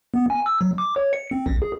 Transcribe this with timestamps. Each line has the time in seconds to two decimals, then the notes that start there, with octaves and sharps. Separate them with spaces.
0.14 B3
0.30 G#5
0.46 E6
0.61 F#3
0.78 D6
0.96 C#5
1.13 C#7
1.31 C4
1.46 A#1
1.62 G#4